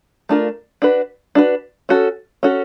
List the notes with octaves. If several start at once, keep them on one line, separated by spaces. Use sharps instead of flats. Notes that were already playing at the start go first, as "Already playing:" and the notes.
A3 D4 F4 A#4
D4 F#4 B4
D4 F#4 B4
C#4 F#4 A4
C#4 F#4 A4